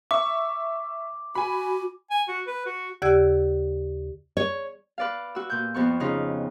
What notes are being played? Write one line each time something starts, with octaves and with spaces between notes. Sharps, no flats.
E5 C#6 D6
F#4 G#5 B5
G#5
F#4
B4
F#4
D#2 C#3 G4 D5 E6 G#6
C#5
B4 D5 F5
F#4 E6
A#2 G6
F2 B3 C#6
C#3 D#4 F4